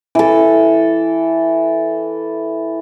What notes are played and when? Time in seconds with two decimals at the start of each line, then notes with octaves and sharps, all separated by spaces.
0.15 E3 A4